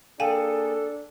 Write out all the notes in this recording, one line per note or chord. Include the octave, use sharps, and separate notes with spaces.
A#3 D4 G#4 A4 F5 G5 G#5